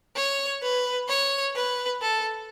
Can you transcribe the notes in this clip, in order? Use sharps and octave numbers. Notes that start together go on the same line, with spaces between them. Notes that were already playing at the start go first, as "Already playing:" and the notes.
C#5
B4
C#5
B4
A4